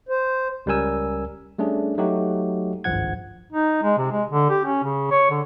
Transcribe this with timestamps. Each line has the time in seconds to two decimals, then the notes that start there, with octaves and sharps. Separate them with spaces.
0.09 C5
0.66 C#2 G3 C#4 A#4 G#5 E6
1.59 G3 A3 C#4 D4 G#4
1.98 F#3 A3 D#4 F#4 G4
2.84 G#1 C#2 G2 F3 F#5 G#6
3.52 D#4
3.83 G#3
3.98 C3
4.11 G#3
4.29 D3
4.50 G4
4.65 C#4
4.84 C#3
5.11 C#5
5.30 D3